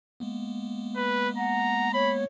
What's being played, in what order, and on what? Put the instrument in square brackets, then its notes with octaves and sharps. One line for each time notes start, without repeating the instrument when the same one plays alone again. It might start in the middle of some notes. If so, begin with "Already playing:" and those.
[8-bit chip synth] G#3 A#3 B3
[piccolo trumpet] B4
[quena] F#5 [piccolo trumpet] A#5
[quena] C#5 [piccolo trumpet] B5